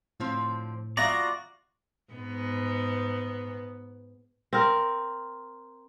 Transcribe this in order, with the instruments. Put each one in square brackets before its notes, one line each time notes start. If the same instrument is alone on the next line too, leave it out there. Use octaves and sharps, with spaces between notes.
[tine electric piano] A2 [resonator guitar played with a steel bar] D3 F3 C4
[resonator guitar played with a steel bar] B3 E5 F5 [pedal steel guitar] F4 F#4 D5 [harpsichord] A#5
[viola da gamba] G#2 B3
[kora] C4 A#4